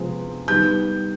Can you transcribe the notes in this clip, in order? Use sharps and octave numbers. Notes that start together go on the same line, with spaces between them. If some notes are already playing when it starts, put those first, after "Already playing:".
Already playing: C3 F3 G#3 B3
D#3 G3 B3 G6